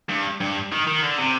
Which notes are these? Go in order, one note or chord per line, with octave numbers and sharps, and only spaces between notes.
G2
G2
D#3
D#3
D3
C3